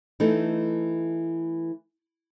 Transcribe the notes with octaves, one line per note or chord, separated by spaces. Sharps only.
E3 A3 D#4 A4